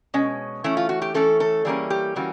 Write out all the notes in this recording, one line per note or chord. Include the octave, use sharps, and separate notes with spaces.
B2 G#3 C#4
E3 A3 C#4 E4
F4
F#4
G4
E3 A3 C#4 A4
A4
E3 G3 A#3 C#4 G#4
G4
E3 G3 A#3 C#4 F#4